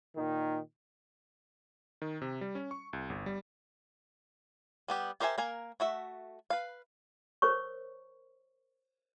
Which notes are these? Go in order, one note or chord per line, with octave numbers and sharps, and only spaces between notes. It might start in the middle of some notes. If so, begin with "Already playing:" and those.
A#2 D#3
D#3
C3
G3
C#4
C#6
C2
G1
G3
G3 B3 G4
G4 A#4 C5 E5 G#5
A#3 A#4 G#5
A3 F#4 E5
B4 F5
A#4 C5 C#5 C#6